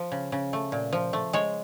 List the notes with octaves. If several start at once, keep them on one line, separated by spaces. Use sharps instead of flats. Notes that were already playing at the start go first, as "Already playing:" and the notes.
Already playing: F3
C#3
C#3
A3
A#2
F3
A3
G#3 C#5